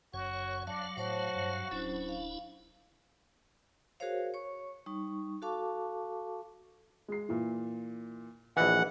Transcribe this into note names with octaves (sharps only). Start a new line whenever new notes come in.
F#1 F#2 F#4 C#5
F#3 D4 F5 D6
A2 F#4 C5 C#5 A5
G2
D1 F#3 C#4 D4 E4 C5
F5
F#4 G#4 A#4 C5 C#5 F5
C#5 C#6
G3 D#4 C#6
F#4 A4 F5 A5 C#6 D6
G#3 C7
A#2 E3
A#1 E3 B4 D#5 F#5 B5